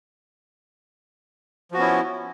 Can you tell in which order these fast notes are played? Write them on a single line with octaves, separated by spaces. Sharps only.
F3 F#4 B3 C#4 E4